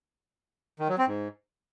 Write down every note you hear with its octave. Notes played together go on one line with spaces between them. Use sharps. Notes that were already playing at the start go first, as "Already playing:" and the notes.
D#3
F#3
C4
G#2